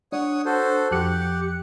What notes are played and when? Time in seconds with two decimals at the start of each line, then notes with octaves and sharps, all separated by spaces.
0.12 D4 C#5 F#5 D#6
0.45 F#4 A4 C5
0.91 F2 G4 F#6 C#7